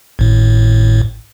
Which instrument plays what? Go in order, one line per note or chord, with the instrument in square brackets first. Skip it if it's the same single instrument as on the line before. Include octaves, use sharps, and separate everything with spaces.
[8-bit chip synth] G#1 A2